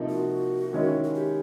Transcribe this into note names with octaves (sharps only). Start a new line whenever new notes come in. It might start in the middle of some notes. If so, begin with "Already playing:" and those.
Already playing: C3 F3 A#3 D#4
F#4
D#3 G#3 C#4 E4
F#4
G4